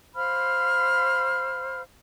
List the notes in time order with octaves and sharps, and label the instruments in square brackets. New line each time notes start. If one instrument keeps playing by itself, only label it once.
[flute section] C5 F5 B5 F6